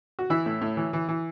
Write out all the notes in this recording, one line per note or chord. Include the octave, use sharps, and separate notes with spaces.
F#4
E3 E4
A2
A2
E3
E3
E3